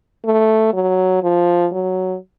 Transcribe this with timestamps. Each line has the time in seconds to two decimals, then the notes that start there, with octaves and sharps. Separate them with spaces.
0.25 A3
0.74 F#3
1.23 F3
1.72 F#3